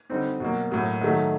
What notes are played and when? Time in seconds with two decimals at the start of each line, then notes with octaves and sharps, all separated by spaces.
0.10 D3 G3 C4 D#4
0.40 B2 F#3 A#3
0.71 A2 F#3 A#3
1.02 D#3 F#3 A3